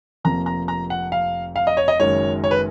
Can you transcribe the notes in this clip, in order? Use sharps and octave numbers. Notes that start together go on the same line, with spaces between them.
F1 F2 F3 A#3 A#5
A#5
A#5
F#5
F5
F5
D#5
C#5
D#5
F#1 F#2 D#3 G#3 C#5
C#5
B4